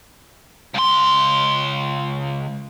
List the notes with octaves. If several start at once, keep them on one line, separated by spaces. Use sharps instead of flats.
C#2 C6